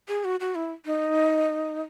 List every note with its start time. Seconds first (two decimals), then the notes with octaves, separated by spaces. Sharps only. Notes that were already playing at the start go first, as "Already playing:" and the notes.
0.09 G#4
0.25 F#4
0.40 F#4
0.55 E4
0.85 D#4